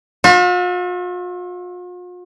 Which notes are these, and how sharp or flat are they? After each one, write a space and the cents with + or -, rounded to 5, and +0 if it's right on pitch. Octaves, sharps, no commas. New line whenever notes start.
F4 +45 E5 +0